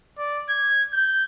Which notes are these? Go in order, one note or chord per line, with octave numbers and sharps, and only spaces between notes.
D5
G#6
G6